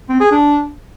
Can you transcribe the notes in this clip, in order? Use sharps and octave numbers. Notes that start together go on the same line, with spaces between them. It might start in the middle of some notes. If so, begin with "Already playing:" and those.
C4
G#4
D4